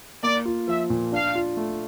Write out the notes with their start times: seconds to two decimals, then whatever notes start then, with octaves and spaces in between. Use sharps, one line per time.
0.23 A#3 D5
0.45 F4
0.68 F3 E5
0.90 A#2
1.12 D4 F5
1.35 F4
1.57 A3